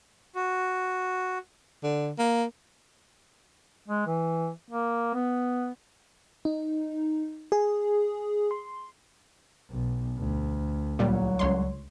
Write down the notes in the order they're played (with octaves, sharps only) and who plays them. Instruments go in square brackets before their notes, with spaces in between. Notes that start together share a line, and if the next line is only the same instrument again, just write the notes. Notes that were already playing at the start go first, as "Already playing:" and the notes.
[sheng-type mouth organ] F#4
[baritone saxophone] D3
A#3
[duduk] G#3
E3
A#3
B3
[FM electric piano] D#4
G#4
C6
[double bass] B1
D2
[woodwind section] C2 F#3 [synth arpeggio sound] A#2 G3
[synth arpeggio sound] C#2 C#5 C6